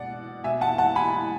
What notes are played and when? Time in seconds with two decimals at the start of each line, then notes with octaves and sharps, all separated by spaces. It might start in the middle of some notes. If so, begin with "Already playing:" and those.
Already playing: B2 D5 F#5
0.44 B2 E5 G#5
0.61 F#5 A5
0.78 F#5 A5
0.95 G#5 B5